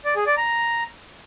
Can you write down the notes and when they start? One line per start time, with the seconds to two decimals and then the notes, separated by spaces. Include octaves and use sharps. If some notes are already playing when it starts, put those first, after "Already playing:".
0.05 D5
0.16 G#4
0.26 D5
0.37 A#5